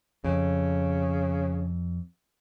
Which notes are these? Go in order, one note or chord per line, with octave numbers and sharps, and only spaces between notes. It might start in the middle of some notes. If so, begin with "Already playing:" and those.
F2 C#3